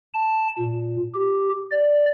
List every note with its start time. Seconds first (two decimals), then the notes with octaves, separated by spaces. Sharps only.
0.14 A5
0.59 A#2
1.14 G4
1.71 D5